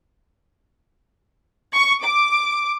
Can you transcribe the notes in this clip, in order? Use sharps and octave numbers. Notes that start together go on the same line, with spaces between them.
C#6
D6